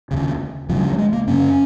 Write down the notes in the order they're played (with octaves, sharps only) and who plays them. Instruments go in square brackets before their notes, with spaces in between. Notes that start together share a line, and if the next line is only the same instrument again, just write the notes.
[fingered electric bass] D#2 C#3
D#2 F3
C#3 F#3
F3
F#3
G#3
A#3
F#2 C#3 C#4